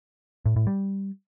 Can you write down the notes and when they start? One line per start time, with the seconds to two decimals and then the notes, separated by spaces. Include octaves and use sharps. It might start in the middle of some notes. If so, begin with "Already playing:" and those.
0.46 A2
0.56 A2
0.67 G3